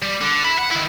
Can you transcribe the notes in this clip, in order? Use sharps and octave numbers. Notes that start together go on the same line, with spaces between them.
G3
D3
E5 B5
F#5
D#3 E4